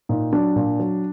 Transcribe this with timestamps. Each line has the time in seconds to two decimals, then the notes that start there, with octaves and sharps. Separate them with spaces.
0.09 A#2 D#4
0.32 F#3 D4
0.56 A#2
0.80 F#3